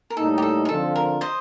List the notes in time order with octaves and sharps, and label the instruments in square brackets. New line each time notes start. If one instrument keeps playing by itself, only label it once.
[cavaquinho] A#4
[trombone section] A2 G3 A#3 D#4 [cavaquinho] A4
[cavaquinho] G4
A4
A#4
[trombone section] D3 F3 C4 F4 [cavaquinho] A4
[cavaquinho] A#4
C5 D#5